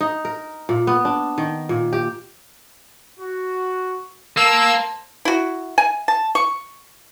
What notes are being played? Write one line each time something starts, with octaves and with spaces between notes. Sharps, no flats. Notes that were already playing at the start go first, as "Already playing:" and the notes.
D#4
A#4
A#2
B3
D4
D#3
A#2
G4
F#4
A#3 C5 A5 E6
E4 F#4
G#5
A5
C#6